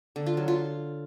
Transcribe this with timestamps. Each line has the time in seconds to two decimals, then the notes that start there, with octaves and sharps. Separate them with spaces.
0.16 D3
0.26 F4
0.37 F#3
0.48 F4